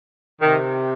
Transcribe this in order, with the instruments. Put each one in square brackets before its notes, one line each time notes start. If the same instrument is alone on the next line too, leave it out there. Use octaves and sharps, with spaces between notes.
[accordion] C3 [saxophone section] D#3